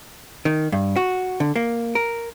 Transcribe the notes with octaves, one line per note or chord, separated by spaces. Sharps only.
D#3
G2
F#4
D3
A#3
A#4